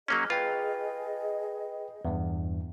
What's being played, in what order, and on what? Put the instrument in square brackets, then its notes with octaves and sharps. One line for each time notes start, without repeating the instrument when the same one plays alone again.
[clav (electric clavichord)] F#3 A#3 C#4 [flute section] G#4 D#5
[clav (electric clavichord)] F4 [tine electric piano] B4 G5
[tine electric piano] E2 G2